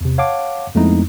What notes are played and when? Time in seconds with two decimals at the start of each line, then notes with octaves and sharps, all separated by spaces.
0.01 E2 C3
0.18 C#5 F5 F#5 A5 D6
0.75 F2 G#3 A3 B3 D#4 E4